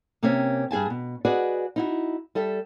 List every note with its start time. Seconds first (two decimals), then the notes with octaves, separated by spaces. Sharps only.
0.23 C3 A#3 C4 C#4 E5
0.71 G2 G#4 G#5 A5
0.90 B2
1.25 F#4 G#4 B4 D5 D#5 F#5
1.76 D#4 E4 F#4
2.35 G3 A4 E5